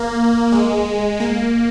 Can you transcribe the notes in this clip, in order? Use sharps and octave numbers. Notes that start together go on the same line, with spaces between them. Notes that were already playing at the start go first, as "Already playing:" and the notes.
Already playing: A#3
G#3
A#3